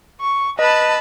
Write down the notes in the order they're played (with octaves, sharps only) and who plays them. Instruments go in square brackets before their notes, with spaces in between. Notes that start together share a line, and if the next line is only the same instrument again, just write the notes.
[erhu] C#6
[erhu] B4 [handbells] D#5 [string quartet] A5 B5 E6